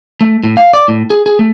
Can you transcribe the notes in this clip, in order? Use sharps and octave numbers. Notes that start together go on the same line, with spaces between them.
A3
A2
F5
D5
A2
G#4
G#4
A3